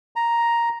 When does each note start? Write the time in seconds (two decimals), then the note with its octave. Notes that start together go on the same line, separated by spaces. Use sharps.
0.16 A#5